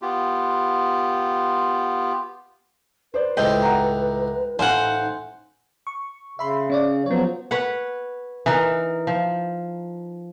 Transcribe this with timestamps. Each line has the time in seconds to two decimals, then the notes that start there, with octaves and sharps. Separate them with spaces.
0.02 B3 F4 G4
3.14 B4 C5 D5
3.37 C#2 A2 C5 D#5 G5
3.62 F#5 A#5
4.59 A1 D#4 C5 F5 F#5 G#5
5.87 C#6
6.39 C#3 E5 B5 C6
6.70 C#4 C#5 D5
7.06 F3 F#3 B3 C#5
7.51 B4 C#5 F#5
8.46 E3 D#4 A#4
9.07 F3